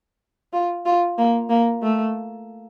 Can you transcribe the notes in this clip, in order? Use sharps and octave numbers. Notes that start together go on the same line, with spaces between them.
F4
F4
A#3
A#3
A3